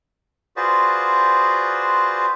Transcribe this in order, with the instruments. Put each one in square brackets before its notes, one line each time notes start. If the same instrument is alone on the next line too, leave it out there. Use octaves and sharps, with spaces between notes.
[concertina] F4 F#4 G#4 B4 C5 D5